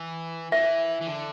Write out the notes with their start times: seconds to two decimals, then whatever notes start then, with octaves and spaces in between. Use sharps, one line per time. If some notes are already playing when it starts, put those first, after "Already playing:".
Already playing: E3
0.52 E3 E5
1.01 E3
1.07 D3